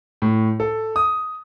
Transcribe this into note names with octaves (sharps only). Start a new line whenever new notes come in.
A2
A4
D#6